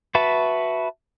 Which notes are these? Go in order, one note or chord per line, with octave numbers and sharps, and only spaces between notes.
F#4 B4 E5 A5